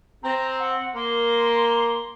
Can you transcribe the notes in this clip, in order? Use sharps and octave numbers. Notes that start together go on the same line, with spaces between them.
C4 A#5
F#5
A#3 C6